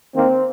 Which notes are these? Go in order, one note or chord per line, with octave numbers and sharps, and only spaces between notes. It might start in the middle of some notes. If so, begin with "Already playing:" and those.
D#3 A#3 C4